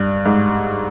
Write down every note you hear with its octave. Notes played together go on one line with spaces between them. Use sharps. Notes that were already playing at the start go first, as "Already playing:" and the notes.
Already playing: G2
G#2